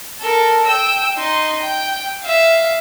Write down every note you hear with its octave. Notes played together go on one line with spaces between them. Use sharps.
A4 A#4
G5 E6
D#4 C6
G5
E5 F5